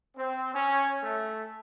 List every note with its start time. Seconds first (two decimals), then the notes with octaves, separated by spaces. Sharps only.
0.16 C4
0.53 C#4
1.02 A3